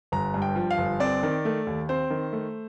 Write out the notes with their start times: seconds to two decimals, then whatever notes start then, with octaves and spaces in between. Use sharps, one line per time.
0.12 G1 A#5
0.34 G2
0.42 G5
0.56 F3
0.71 F5
0.78 G1
1.00 C4 D5
1.23 D#3
1.45 A3
1.67 D#2
1.89 C4 C5
2.10 D#3
2.33 A3